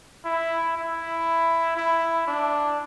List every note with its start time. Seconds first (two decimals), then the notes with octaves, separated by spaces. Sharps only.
0.25 E4
0.77 E4
1.77 E4
2.27 D4